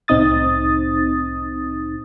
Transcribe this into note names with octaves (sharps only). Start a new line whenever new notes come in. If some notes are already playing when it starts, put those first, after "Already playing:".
C2 A2 C4 D#4 D#6 A6